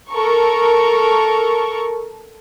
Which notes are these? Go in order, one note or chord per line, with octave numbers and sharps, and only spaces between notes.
A4 A#4 C#6